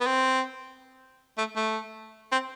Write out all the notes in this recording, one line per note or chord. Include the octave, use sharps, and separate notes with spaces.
B3
C4
A3
A3
C4